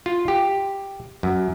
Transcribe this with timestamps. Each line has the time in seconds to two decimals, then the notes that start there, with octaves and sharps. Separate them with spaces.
0.06 F4
0.28 G4
1.23 F#2